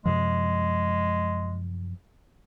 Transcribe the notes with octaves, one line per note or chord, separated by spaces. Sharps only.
F#2 C3 F3 G#3